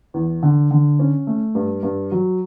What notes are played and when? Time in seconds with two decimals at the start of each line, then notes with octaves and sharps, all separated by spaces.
0.14 E2
0.43 D3
0.71 D3
0.99 C#4
1.27 A3
1.55 G2
1.83 G2
2.12 F#3